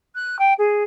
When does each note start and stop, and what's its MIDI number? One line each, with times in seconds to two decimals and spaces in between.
0.15 0.39 90
0.39 0.53 79
0.58 0.83 68